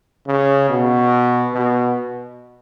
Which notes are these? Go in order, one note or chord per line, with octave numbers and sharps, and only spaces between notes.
C#3
B2
B2